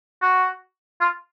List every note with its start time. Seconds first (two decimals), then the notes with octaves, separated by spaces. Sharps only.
0.22 F#4
1.01 F4